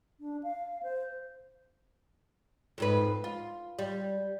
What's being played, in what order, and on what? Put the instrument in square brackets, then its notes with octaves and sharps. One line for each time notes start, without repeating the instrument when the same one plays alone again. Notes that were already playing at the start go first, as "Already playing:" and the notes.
[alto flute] D4
F5
C5
[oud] F2 G#2 B4
F4
G3